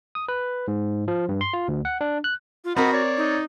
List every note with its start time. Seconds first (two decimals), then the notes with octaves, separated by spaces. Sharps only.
0.15 D#6
0.29 B4
0.68 G#2
1.08 F3
1.29 G2
1.41 C6
1.53 F4
1.68 D2
1.85 F#5
2.01 D4
2.24 F#6
2.65 F4
2.76 C4 F#4 A#4 D#5 F#5 B5
2.93 C#5 D5
3.17 D#4